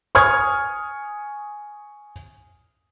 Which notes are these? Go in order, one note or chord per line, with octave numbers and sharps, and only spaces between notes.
G#5 C#6 D#6 F6 G#6